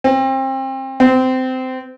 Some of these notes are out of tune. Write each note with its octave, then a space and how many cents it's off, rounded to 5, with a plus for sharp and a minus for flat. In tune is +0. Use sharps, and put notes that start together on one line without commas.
C4 +30
C4 -20